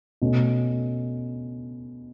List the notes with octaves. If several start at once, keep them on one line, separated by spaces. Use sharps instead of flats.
B2 A3 C#4